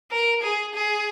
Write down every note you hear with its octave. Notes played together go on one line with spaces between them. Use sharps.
A#4
G#4
G#4